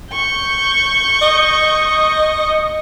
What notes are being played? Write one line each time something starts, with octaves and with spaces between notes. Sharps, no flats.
C#6 G6
D#5